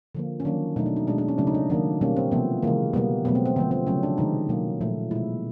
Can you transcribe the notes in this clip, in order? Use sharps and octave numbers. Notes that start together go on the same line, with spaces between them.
D3 F3 A#3
C#4
D#3 F#3 A#3 D4
B2 F#3 A3 D#4
D4
D#4
B2 G#3 D4
D4
C#4
C#3 F#3 A3 D4
D#4
D4
D#3 F#3 A#3 D4
B2 G3 A#3 C#4
C4
C3 F3 A3 B3
C#3 E3 G#3 A#3
B2 G3 A#3 B3
B2 F#3 A3 B3
C4
C4
D3 F3 A3 B3
C4
C#3 F#3 A3 C#4
D4
C3 D#3 G#3 D#4
B2 F#3 A#3
A#2 F3 A3
B2 G#3 E4